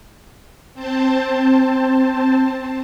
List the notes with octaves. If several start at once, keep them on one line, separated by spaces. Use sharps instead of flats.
C4 C5 A5